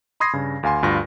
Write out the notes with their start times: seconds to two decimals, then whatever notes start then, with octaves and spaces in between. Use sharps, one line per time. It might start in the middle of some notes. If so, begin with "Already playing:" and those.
0.20 B5 C6 D#6 G#6 A#6 C7
0.33 G2 C#3
0.63 D2 F5 G#5 C6
0.82 D2 G2 F4 A#6